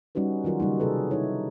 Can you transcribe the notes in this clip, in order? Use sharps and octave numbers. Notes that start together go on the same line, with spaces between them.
G3 C#4 D#4 F#4 B4
D#3 F#3 F4 F#4 A#4
C#3 G3 A#3 D#4
C3 G#4 A4 B4
D#4 E4 C#5